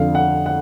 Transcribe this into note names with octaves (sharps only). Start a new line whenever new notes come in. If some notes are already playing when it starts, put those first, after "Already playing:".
Already playing: F2 D3 F5
F#5
F#5